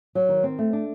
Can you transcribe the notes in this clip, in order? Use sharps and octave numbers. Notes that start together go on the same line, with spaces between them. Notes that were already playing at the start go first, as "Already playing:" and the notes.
F#3
D#3
C4
A3
D4